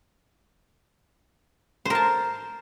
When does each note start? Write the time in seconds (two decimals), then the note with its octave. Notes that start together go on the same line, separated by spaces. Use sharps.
1.85 C5
1.90 A#4
1.95 A5